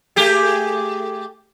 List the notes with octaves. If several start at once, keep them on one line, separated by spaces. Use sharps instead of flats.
A3 G4 G#4